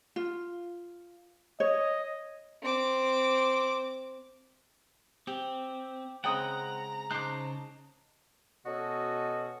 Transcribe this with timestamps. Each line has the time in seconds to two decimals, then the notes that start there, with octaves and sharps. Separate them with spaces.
0.16 F4
1.60 C#5 D#5
2.63 C4 D6
5.27 C4 G4
6.24 C#3 G#3 C4 F#5 G5 A#5 D#6
7.11 C#3 D#4 C5 A5 D6 F#6
8.66 B2 C#4 F#4 A4 D#5